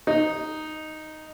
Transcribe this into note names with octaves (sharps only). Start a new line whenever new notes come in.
D#4